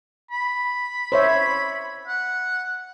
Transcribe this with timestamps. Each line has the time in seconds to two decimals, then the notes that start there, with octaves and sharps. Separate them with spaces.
0.31 B5
1.12 C5 C#5 E5
2.07 F#5